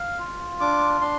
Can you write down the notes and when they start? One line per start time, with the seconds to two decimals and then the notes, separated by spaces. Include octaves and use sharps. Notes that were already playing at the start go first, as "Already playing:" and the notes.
Already playing: F5
0.19 F4
0.60 D4 D6
1.01 D4 C6